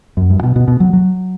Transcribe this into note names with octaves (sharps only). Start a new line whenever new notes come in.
F#2
G2
B2
B2
B2
F#3
F#3